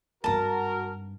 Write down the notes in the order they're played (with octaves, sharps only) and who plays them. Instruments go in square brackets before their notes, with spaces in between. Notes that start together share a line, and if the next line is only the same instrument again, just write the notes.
[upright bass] G#1 G2 [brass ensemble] F#4 A#4 [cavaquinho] A5 A#5